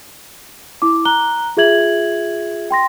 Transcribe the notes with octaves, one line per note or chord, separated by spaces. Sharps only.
E4 D6
A#5 F#6 G7
F4 G#4 E5 G#6 F#7
G5 C6 A#6